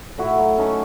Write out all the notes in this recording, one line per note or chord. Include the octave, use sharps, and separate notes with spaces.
A2 E4 F#4
F#3
A3 C#4 D#4